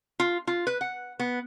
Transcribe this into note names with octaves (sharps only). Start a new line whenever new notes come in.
F4
F4
B4
F#5
B3